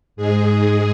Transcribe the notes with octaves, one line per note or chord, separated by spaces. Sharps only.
G#2 G#3 G#4